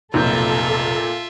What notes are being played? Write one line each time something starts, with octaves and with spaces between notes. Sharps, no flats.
F1 B1 A#2 F4 A4 E5 G6